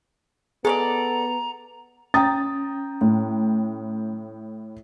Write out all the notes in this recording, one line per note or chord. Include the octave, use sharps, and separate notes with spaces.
B3 G#4 A4 C#5 D5 A#5
C#4 G5 A#5 D#6 A6
A2